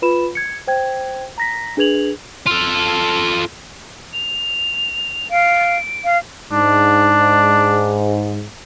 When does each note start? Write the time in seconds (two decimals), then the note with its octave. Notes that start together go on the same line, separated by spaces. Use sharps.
0.02 F4 B4 B5 E7
0.35 G#6 C#7
0.67 C5 G5 G#6
1.38 A#5 A#6 B6
1.77 D4 G#4 B4 G#6 F7 F#7
2.47 F4 A4
4.13 F7
5.31 F5 D7
6.04 F5
6.52 G#2 D4